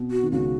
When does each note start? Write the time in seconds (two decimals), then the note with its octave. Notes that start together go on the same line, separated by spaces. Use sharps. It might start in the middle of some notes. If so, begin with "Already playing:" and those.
Already playing: B2
0.11 F#4
0.23 D#3
0.32 C#2 C#3 F#4